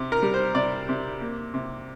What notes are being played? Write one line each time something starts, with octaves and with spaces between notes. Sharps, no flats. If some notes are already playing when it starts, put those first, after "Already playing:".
Already playing: C3
A#4
G3
C5
C3 D5
C3
A#3
C3